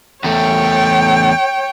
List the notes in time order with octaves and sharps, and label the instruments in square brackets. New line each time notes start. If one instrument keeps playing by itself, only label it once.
[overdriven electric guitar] E2 A3 [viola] C#5 G5